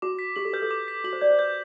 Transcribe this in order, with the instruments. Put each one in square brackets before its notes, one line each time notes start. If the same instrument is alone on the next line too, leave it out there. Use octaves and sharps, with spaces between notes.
[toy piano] F#4 [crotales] D6
[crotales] B6
[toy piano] G4 [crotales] F#7
[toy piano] A4
[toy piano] B4 [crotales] G6
[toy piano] A4
[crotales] D6
B6
[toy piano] F#4 [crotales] F#7
[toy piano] C5
[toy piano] D5 [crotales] G6
[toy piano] C5
[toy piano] B4 [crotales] G6